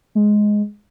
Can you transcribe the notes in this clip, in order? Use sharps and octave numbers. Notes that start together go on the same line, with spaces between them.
G#3